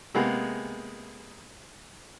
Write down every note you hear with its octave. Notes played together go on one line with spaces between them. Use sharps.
C3 G#3 A#3 B3 G#4